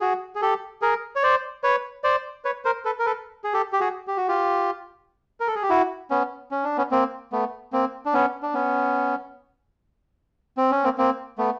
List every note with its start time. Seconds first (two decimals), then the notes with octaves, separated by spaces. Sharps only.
0.01 F#4 G#4
0.35 G#4
0.42 G4 A4
0.82 G#4 A#4
1.16 C#5
1.23 C5 D5
1.64 B4 C#5
2.04 C5 D5
2.45 B4 C#5
2.65 A#4 C5
2.85 A4 B4
2.99 A#4
3.06 A4 B4
3.44 G#4
3.53 G4 A4
3.73 G4
3.80 F#4 G#4
4.07 G4
4.17 F#4
4.28 F4 G4
5.40 A#4
5.47 A4
5.55 G#4
5.62 G4
5.70 E4 F#4
6.11 B3 C#4
6.51 C#4
6.64 D4
6.77 B3 C#4
6.92 A#3 C4
7.32 A3 B3
7.73 A#3 C4
8.06 D4
8.13 B3 C#4
8.43 D4
8.54 B3 C#4
10.57 C4
10.71 C#4
10.84 A#3 C4
10.98 A#3 C4
11.38 A3 B3